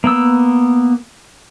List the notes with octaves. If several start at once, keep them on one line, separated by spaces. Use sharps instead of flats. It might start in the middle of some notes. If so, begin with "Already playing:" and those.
A#3 B3 E6